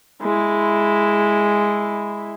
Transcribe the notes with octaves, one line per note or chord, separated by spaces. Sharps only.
G#3 E4